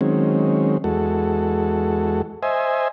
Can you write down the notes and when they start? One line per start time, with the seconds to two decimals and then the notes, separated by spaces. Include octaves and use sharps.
0.01 D#3 F#3 G#3 C4 C#4
0.84 E2 G#3 F#4 A4
2.43 C5 D#5 E5 G#5